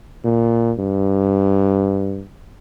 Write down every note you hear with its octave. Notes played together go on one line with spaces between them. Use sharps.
A#2
G2